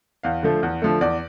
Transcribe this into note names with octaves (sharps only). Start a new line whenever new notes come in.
E2 F5
D3 F3 A3
E2
D3 F3 A3
E2 D5